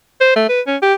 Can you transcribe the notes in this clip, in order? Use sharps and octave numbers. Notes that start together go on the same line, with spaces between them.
C5
A3
B4
C#4
G4